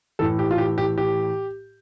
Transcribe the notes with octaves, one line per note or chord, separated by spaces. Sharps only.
A2 E3 A4
G4
F4
G4
G4
G4